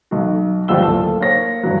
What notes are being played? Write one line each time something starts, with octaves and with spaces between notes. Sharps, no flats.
B1 F#4
G1 F3 G3 F4 E6 G7
D1 A#3 A4 A5
A#3 C5 C#5 A#6
G2 E3 F#3